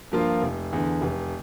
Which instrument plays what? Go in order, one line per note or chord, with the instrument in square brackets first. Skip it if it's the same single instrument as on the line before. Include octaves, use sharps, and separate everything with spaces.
[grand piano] G2 F3 A#3 F4
F1
E2 D3
F1